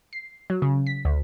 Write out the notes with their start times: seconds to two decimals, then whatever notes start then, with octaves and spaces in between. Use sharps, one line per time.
0.13 C7
0.50 F#3
0.62 C#3
0.87 B6
1.05 D2